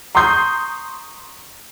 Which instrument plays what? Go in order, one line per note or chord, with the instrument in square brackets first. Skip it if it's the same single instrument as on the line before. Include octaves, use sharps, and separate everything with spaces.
[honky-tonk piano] A#5 C6 C#6 D#6 G6 C7